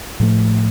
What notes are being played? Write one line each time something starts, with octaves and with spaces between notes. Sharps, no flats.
A2 F3 A3